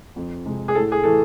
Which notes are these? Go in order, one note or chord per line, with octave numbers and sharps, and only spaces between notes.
F2
C3 G#3
G#4
A2 A4
G#4
E3 A3 A4